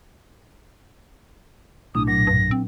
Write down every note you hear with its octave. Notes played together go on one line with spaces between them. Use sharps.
B1 A2 D4 D#6
A#2 F#3 A#6
G2
C4